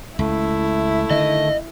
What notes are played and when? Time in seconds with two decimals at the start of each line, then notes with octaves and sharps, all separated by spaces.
0.19 C#2 A3 E4
1.11 D3 D#3 D#5